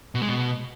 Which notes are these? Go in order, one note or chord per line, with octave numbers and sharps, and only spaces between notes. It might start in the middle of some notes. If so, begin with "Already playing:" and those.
B2
G#3
B2